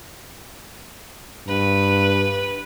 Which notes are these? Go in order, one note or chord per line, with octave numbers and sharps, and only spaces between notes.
G2 B4